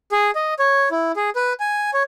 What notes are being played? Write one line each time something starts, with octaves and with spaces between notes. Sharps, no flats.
G#4
D#5
C#5
E4
G#4
B4
G#5
C#5